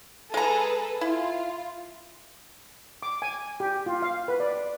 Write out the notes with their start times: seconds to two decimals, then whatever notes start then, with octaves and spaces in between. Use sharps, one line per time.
0.34 G#3 G#4 A4 B4 A#5
1.01 E4 F4
3.03 D6
3.22 G#5
3.60 G4
3.86 F4
4.02 F5
4.28 B4
4.40 D5